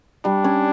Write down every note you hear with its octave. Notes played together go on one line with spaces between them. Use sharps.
G3 D4
C#4